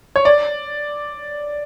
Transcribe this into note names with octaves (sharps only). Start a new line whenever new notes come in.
C#5
D5